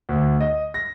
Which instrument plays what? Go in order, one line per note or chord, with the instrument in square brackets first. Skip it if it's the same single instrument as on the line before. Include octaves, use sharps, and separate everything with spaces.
[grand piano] D2
D#5
A#6